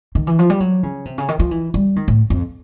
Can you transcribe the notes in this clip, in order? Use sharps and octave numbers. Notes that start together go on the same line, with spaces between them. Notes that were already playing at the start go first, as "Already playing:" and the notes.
D#3
E3
F3
G3
F#3
C#3
C3
C#3
D#3
F3
E3
G3
D#3
A2
F2